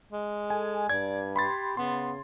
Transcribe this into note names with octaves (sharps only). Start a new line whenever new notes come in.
G#3
A4 G#5
G2 D5 G#6
G4 B5 C6 A6
C#3 B3 C6